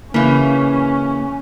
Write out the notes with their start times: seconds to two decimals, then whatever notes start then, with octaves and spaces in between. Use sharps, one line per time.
0.14 C#3 E3 A#3 C#4